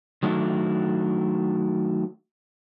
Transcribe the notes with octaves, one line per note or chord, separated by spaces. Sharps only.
D#3 F#3 A3 D4 E4